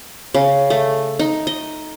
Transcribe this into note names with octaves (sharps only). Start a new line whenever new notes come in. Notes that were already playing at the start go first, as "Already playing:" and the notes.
C#3
A3
D#4
D#5